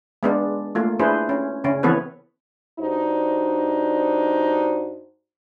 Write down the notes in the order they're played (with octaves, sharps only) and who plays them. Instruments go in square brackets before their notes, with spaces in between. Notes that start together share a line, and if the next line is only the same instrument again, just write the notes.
[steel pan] G#3 B3 D4
A3 A#3 F4
D4 E4 G#4 B4 C5
C#4
C#3 C#4
E3 B3 C4 A4 B4 C#5
[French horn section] G2 D4 D#4 F#4 C5